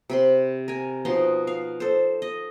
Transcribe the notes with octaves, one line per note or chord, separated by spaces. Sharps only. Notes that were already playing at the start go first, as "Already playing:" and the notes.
C3 B5 C6
A#4 G#5
B2 F3 D#4 C6
F5
A4 C5
D#5